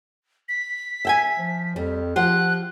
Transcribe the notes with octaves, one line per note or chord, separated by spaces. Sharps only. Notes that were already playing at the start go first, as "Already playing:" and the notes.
B6
E5 G5 G#5
F3
F2 G3
F3 F4 G4 F#5 F#6